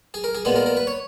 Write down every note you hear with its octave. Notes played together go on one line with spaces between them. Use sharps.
G#4
A#4
G#4
A#2 G#3 B3 G#4
A#4
A#4
B4
C#5